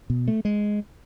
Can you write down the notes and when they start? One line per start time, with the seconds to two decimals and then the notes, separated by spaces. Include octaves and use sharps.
0.10 B2
0.28 A3
0.45 G#3